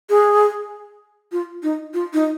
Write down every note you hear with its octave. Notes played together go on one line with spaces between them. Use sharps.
G#4
F4
D#4
F4
D#4